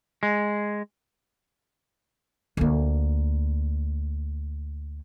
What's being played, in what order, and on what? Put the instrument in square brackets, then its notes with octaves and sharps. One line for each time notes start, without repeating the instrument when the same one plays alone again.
[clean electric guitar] G#3
[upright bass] D2 A#3